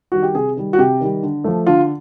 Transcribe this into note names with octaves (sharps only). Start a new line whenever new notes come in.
D#3 G3 F#4
G4
C3 G#4
D#3 G3
F#4
C3 G4
D#3 G3
D3
F3 A3
D3 F4